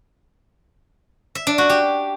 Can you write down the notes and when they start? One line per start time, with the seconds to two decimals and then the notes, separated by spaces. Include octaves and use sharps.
1.35 E5
1.47 D4
1.58 F#4
1.70 G4